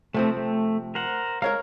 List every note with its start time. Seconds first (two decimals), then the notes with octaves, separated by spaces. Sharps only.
0.14 C3 F3 A3 C4
0.37 A3
0.95 A#4 C5 F#5
1.42 G#3 A#4 C#5 F5 A#5 F6